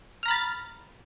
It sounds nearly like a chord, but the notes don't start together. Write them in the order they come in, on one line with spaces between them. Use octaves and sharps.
F6 A#5 B5 A6